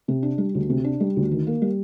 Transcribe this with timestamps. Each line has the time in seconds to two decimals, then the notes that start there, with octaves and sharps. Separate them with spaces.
0.08 C3
0.23 D4
0.38 G3
0.55 D2
0.70 C3
0.84 D4
1.00 G3
1.16 D2
1.31 D#3
1.47 A#3
1.62 G3